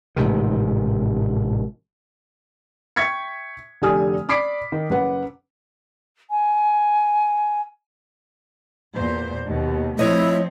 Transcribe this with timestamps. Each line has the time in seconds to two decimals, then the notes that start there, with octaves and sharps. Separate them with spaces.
0.16 A1 G#2 C3 D#3
2.96 E5 G5 C#6 G#6 B6 C#7
3.82 F1 D3 G4 G#5 D#6 F6
4.29 D5 B5 D6 B6 C7 D7
4.72 D#3
4.90 F#1 B4 F#5
6.31 G#5
8.94 E2 A#2 C5
9.46 D#2 B2
9.99 F3 A3 C4 E4 C#5 D#5